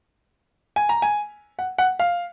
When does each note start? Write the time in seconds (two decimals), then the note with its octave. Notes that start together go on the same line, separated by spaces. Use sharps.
0.76 G#5
0.89 A#5
1.02 G#5
1.59 F#5
1.78 F#5
1.99 F5